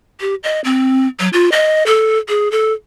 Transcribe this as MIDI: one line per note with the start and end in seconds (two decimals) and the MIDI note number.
0.21 0.35 67
0.44 0.61 75
0.64 1.07 60
1.20 1.29 54
1.33 1.52 65
1.52 1.85 75
1.86 2.18 69
2.29 2.50 68
2.52 2.73 69